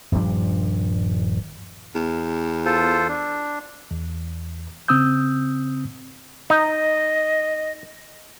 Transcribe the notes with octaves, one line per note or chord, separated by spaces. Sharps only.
D#1 G2 F3 D4
E2
F4 A4 C5
D4
E2
C#3 C4 D#6 E6 G6
D#4 D#5